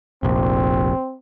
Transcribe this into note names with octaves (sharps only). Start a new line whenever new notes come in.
F1 A#1 C4